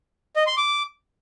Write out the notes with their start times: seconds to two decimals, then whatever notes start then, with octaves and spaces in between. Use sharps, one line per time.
0.36 D#5
0.47 C6
0.57 D6